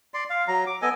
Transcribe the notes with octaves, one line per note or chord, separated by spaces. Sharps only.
D5 C6
F5
F#3 A#5
D6
B3 A4 D#5 G#5